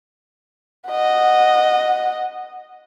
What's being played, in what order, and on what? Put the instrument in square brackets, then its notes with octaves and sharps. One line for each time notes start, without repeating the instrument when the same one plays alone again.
[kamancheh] D#5 F#5